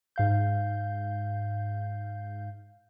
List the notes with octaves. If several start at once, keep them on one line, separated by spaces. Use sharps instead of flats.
G#2 F5 G6